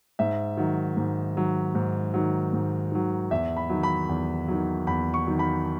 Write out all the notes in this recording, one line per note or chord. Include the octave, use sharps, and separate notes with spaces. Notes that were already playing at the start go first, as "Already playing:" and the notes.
G#2 E5
D#3 F#3
G#2
D#3 F#3
G#2
D#3 F#3
G#2
D#3 F#3
E2 E5
B5
D#3 F#3
B5
E2
D#3 F#3
E2 B5
C#6
D#3 F#3
B5